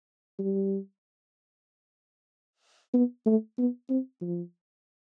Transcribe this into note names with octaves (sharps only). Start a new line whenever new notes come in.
G3
B3
A3
B3
C4
F3